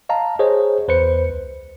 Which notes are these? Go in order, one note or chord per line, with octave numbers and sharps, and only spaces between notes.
D#5 F5 A5 A#5
G#4 C5 C#5 D#5
E2 B4 C5 C#7
C#2